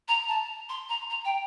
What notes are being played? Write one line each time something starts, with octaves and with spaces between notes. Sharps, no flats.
A#5
A5
C6
A#5
A#5
G5